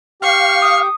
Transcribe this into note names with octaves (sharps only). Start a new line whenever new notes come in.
G4 F5 G5 C#6 C7
D#6